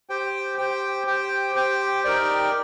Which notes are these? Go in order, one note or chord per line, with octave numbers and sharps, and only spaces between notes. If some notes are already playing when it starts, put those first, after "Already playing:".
G4 C5 G5
G4 C5 G5
G4 C5 G5
G4 C5 G5
D#4 G4 A#4 D5 G5